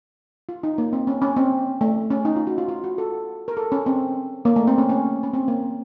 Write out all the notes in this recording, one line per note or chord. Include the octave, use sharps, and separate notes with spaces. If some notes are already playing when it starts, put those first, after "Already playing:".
F4
D#4
A#3
C4
C#4
C#4
C4
A3
C#4
D#4
F4
F#4
F4
F4
F#4
A4
A#4
A4
C#4
C4
A#3
A3
C4
C#4
C#4
C#4
C4
A#3